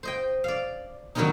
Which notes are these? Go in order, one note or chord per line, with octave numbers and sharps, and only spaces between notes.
C5 D#5 G5
D5 F5
D#3 F#3 G3 B3 C#4 D#4